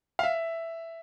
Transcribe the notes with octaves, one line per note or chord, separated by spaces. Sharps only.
F5
E5